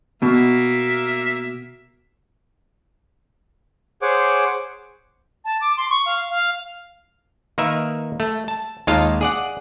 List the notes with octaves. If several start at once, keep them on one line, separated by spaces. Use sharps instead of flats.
B2 A#3 E5
G#4 C5 C#5 F#5 D6
A5
D6
C6
C#6
F5
F5
D#3 A#3 A#4 B4 E5
A3
A5
D#2 G#3 D#4 F4 F5 A5
G#4 D5 F#5